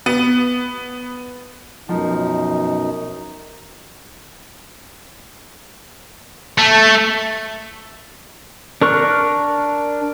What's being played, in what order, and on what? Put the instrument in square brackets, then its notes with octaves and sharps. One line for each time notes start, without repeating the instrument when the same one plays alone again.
[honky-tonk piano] B3
[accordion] F#2 B2 D#4 [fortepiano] F3
[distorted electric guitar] A3
[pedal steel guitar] D4 A#4 C#6 F#6